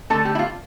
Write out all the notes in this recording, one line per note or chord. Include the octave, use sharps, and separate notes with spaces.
D3 A3 A4
G4
E4
F4